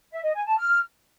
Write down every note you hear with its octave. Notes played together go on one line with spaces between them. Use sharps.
E5
D#5
G#5
A5
F6